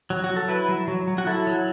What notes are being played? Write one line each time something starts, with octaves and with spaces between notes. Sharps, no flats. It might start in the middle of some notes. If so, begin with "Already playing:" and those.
F#3
F#4
F#3
A4
E4 B4
F#3
F#3
F#3
F#4
E4 A4
F#3